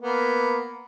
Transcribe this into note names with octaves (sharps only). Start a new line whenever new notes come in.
A#3 B3